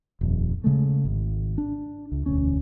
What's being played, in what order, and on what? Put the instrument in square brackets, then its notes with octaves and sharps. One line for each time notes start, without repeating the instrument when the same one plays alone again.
[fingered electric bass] D#1 F2
C#3 G#3 A3
G#1
D4
C#2
E1 D2 C#4